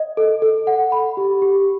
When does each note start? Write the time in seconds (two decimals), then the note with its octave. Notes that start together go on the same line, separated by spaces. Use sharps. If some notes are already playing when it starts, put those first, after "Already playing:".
Already playing: D#5
0.17 A4
0.42 A4
0.67 F#5
0.92 B5
1.17 G4
1.42 G4